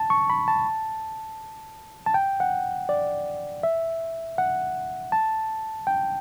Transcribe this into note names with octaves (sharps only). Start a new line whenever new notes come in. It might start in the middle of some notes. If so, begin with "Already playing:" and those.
Already playing: A5
C#6
B5
A5
A5
G5
F#5
D5
E5
F#5
A5
G5